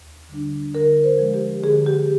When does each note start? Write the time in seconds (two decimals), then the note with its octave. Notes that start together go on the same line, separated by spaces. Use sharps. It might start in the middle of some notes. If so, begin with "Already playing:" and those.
Already playing: D#2
0.29 D3 G3 D4
0.74 D3 A#4
1.04 C5
1.19 F3 G#3
1.34 G4
1.63 D3 G#4
1.86 G4